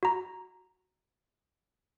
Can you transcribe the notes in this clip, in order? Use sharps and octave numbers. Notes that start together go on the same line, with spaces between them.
F#4 A#5